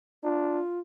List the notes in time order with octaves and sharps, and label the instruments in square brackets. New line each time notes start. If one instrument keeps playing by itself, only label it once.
[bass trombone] D4 [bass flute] F4